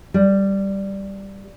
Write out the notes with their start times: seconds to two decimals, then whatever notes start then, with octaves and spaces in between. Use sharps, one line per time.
0.14 G3